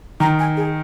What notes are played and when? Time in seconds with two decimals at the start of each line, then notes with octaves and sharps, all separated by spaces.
0.20 D#3 A#5
0.39 G#5
0.57 G#4